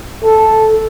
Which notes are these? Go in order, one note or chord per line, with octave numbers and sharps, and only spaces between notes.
A4